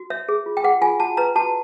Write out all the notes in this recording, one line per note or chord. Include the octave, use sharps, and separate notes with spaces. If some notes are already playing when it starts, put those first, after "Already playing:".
Already playing: F#4
C#5 E5
G#4
F4
G5
G#4 F#5
F4 G#5
F#4 A5
B4 A#5
F#4 A5